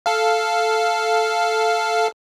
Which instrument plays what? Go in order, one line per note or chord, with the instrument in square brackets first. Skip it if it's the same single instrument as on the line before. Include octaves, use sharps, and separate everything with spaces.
[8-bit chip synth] A4 F5